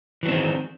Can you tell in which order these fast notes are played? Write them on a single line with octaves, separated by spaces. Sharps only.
E3 F#3 C4 D#3